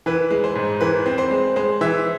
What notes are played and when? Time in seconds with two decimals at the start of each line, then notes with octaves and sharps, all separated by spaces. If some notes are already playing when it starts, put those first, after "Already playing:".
0.06 E3 B4
0.30 G#3
0.44 C5
0.55 G#2
0.81 E3 B4
1.06 C4
1.18 C5
1.31 G#3
1.56 G#3 C5
1.81 E3 E5